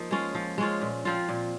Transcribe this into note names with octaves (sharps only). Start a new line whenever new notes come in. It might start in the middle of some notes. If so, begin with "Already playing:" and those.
Already playing: F3 A#3 D#4
G#3 C#4 F4
F3
G#3 C#4 F4
A#2
F3 C4 F4
A#2